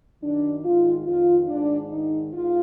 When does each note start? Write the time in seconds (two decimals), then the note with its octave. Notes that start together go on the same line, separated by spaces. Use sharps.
0.22 F#2 D#3 D4
0.64 G#2 D#3 F4
1.06 F2 D#3 F4
1.48 G#2 D#3 D4
1.89 G#2 D#3 D#4
2.32 G#2 F4